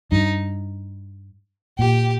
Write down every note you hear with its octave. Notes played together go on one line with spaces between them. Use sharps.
G2 D#4
A#2 G4